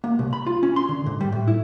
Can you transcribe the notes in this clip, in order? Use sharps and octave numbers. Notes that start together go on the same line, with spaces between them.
A#3
C2
B5
F4
C#4
C6
D3
G#2
G3
A2
E4